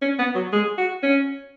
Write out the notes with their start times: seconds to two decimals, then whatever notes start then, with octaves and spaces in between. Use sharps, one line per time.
0.02 C#4
0.19 B3
0.35 F#3
0.53 G#3
0.78 F#4
1.03 C#4